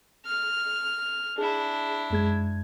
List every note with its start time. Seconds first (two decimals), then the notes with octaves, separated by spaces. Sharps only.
0.25 F6
1.38 D4 E4 G#4
2.10 F#2 G#3 G#6